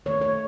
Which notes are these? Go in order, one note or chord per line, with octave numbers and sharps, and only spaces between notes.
D#3 A3 C#5
C#5